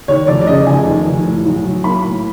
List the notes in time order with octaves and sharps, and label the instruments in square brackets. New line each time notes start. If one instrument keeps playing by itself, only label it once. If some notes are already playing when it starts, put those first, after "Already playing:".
[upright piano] D#2 C#5
F1 D5
D5
C#3 D#5
F1 G#5
D#2
F1
A2
B1
F#3
A#3 B5
A2